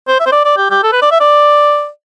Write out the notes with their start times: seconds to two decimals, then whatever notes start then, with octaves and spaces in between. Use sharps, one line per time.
0.08 C5
0.20 E5
0.26 C5
0.32 D5
0.45 D5
0.57 G4
0.70 G4
0.83 A4
0.92 B4
1.01 D5
1.11 E5
1.20 D5